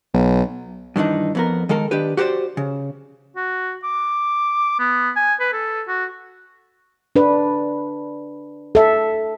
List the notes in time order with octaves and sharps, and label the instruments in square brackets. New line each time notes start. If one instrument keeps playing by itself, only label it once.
[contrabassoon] B1
[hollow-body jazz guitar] G2 D#3 E3 D4 D#4
F2 B3 A#4
D#3 G#3 A4 A#4
D#3 D4 G4 B4
F#4 G4 A#4 C5 D5
C#3
[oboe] F#4
D6
B3
G#5
B4
A4
F#4
[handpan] D4 B4
A4 E5